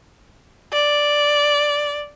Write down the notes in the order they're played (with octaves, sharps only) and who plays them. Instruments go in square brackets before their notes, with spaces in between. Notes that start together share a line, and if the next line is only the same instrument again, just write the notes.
[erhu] D5